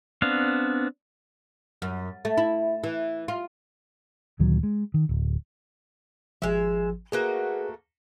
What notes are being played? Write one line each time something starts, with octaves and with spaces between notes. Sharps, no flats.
B3 C4 D4 F5
F#2
A3
E4
E3
F4
D2 A#2 D#3 F#3
G#3
D#3
D1
G#1 F3 G#3 E5
A3 A#3 F#4 G#4 B4